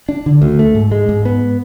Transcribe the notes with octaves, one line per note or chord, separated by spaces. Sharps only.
D4
D3
D2
A3
G#2
G#3
G#2
B3